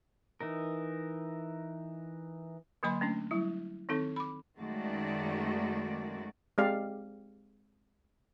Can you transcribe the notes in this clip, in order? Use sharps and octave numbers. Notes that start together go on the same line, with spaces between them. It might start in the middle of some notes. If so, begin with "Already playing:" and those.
E3 D#4 A#4
D3 F#3 A#3 D#5 B5 C6
A3 C#4 D4
F#3 G3 E4
D#3 C4 D#4 A4
B5 D6
F#2 D#3 G#3 A3 F#4 D5
G#3 C4 G4 D5 F5